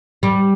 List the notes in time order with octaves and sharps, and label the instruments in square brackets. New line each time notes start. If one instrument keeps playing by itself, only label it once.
[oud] G3